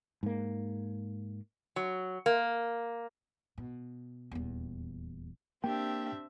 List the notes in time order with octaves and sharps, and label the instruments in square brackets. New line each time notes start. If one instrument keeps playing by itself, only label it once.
[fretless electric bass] G#2 A#3
[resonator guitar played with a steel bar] F#3
A#3
[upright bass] B2
D#1 E2
[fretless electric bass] A#3 [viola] C4 E5 [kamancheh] D4 G4 [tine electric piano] G5